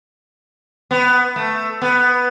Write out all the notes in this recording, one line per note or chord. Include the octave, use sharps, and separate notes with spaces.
B3
A3
B3